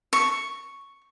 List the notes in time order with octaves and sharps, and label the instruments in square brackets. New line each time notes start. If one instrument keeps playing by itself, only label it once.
[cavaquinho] C#6